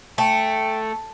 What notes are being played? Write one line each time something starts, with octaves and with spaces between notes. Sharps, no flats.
A3 G5